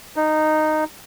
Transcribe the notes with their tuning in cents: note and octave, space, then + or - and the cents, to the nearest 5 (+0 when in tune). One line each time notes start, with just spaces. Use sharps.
D#4 -10